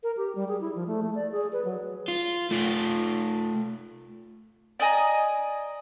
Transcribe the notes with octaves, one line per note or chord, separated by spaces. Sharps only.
A#4
G4
G3
G#4
E4
F3
A3
A3
D5
G#4
B4
F#3
F4
A3 F4
D5 D#5 G#5 A#5